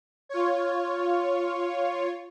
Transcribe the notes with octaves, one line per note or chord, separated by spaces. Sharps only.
F4 C#5